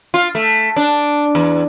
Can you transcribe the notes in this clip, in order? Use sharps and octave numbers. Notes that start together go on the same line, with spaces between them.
F4
A3
D4
E2